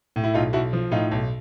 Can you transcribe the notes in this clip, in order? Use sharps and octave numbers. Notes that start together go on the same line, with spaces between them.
A2
E4
B1 D#4 F4
B1 E4 F#4
F3
A2 D#4 F4
B1